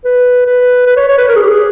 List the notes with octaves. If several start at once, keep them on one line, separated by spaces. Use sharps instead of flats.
B4
B4
B4
C#5
C#5
B4
A#4
G#4
G4
G#4